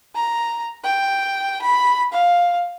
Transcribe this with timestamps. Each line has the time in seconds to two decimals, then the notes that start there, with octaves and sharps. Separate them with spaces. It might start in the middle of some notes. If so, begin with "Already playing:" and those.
0.15 A#5
0.84 G5
1.62 B5
2.13 F5